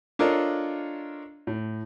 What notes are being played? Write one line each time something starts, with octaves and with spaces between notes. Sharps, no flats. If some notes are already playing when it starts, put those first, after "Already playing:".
D4 F4 A4 A#4 C#5 D#5
A2